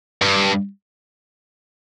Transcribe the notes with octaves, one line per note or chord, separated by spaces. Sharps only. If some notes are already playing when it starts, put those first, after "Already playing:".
G2